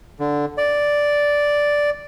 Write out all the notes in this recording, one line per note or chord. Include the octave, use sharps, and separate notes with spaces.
D3
D5